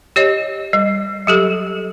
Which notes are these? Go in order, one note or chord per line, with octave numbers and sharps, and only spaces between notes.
G4 C#5 D#5
G3
F#3 G4 A4